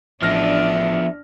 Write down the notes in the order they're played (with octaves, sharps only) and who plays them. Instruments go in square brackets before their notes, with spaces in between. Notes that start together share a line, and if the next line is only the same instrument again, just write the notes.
[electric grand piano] A1 F6 A#6 [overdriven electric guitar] F3 B3 [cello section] D4 [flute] E5